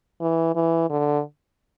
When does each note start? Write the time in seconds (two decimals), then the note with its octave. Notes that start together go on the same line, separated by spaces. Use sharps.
0.21 E3
0.55 E3
0.90 D3